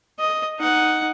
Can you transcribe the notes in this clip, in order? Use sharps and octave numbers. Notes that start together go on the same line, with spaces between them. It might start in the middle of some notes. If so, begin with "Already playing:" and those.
D#5
D#4 F#5